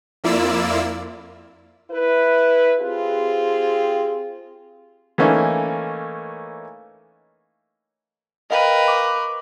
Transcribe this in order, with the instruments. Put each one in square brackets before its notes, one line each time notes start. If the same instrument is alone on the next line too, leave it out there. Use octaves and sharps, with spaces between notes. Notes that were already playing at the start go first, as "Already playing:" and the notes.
[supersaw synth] F2 A#3 E4 F4 D5 E6
[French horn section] E4 B4
C4 F4 G4 G#4
[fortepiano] E3 A3 A#3 C#4 D#4
[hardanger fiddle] A#4 B4 [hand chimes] D#5 F5 G5
[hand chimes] C#6 D6